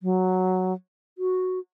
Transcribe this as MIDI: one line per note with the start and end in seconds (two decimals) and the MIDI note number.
0.02 0.73 54
1.18 1.59 66